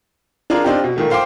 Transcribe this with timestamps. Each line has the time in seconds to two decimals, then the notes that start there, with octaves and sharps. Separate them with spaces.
0.50 D4 F4 G#4 A#4
0.64 C4 D4 D#4 F4 G4
0.84 B2
0.96 A#2 D#3 A3
1.10 C5 F5 G5 C6 D6